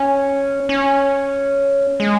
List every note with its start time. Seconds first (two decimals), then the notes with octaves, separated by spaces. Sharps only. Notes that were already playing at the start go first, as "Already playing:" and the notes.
Already playing: C#4
0.69 C#4
2.00 G#3